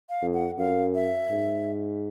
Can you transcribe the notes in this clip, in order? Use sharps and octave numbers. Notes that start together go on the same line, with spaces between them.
F5
F2
F#5
F#2 F5
E5
G#2